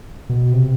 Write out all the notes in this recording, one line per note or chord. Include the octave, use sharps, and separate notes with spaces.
B2
C3